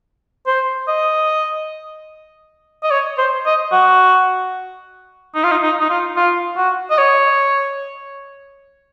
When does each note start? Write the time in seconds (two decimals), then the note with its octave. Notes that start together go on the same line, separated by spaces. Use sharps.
0.47 C5
0.88 D#5
2.83 D#5
2.91 C#5
3.18 C5
3.46 D#5
3.72 F#4
5.35 D#4
5.44 F4
5.51 D#4
5.62 D#4
5.80 D#4
5.90 F4
6.16 F4
6.56 F#4
6.91 D#5
6.98 C#5